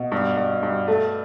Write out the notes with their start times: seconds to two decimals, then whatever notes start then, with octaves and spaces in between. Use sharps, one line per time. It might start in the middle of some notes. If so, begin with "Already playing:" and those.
Already playing: B2
0.12 G2
0.37 G2
0.63 G2
0.88 A3